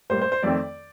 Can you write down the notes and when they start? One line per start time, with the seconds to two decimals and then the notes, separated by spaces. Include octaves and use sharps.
0.10 A2 G3 A#3 C5
0.21 C5
0.32 C5
0.43 F2 D#3 A3 C4 D5